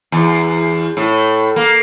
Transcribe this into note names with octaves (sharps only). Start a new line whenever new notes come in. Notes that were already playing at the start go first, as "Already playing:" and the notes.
E2
A2
A#3